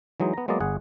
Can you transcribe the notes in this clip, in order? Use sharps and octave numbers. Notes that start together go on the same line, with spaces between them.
E3 F#3 G#3 D#4
B3 A#5
F#3 G#3 A#3 B3 D5 D#5
G1 G#4 F#5